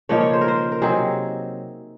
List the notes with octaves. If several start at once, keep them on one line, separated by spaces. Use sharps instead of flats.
C#3 F3 A#3 D#4 C#5
C#5
C5
A#4
C5
A#4
C3 F#3 C4 D#4 G#4